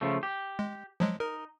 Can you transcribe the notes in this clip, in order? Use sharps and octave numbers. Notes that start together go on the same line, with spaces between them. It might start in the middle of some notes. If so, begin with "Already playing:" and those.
C#3 F3 A3
G4
G#3
F3 F#3 G#3
D#4 A#4